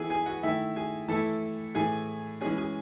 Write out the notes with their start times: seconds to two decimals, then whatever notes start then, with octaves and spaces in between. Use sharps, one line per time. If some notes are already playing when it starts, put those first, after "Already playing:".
Already playing: E3 B3 E4 G#4 A4 G#5
0.10 G#4 G#5
0.26 F#4 F#5
0.43 D#3 A3 E4 E5
0.76 G#4 G#5
1.08 E3 A3 E4 A4 A5
1.74 A2 E3 A3 G#4 G#5
2.41 E3 G#3 C#4 G#4 G#5
2.57 G#4 G#5